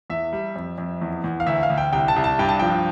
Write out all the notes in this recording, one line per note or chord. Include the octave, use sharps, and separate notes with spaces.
E2 E5
G3
F2
F2
E2
E2
F5
D2 E5
F5
D2
G5
C2 G5
A5
C2
A5
G2 G5
A5
F3 G5